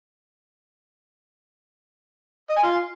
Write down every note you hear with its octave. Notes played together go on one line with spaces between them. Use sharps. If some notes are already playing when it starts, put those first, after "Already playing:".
D#5
G#5
F4